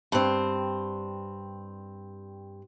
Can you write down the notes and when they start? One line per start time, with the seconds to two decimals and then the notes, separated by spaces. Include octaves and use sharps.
0.12 G2 C4